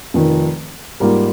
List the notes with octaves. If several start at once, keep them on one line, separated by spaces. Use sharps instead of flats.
F1 F2 D#3
G#2 G3 A#3 F4 A#4